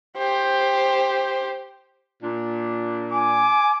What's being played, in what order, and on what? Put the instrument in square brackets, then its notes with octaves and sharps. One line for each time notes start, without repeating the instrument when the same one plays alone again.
[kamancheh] G4 C5
[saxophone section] A#2 D4
[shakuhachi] G#5 [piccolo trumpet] D6